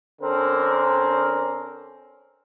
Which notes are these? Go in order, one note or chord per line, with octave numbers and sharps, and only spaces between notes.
D3 C4 C#4 A#4